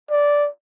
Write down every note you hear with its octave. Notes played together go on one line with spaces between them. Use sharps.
D5